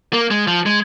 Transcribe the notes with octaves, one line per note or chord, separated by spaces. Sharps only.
A#3
G#3
F3
G#3